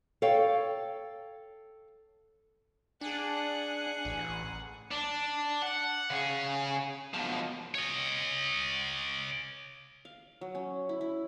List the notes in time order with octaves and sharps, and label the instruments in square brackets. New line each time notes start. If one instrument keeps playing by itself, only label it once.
[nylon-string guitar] A4 C#5 F5 G5
[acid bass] D4 [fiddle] G#4 F#5
[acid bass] A1
[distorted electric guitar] D4
F#5
C#3 G#4
B2 F3
C#5 D#5
[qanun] F5
F#3
C#4
E4
E4